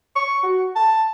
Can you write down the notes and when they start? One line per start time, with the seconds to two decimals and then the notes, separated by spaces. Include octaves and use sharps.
0.16 C#6
0.43 F#4
0.76 A5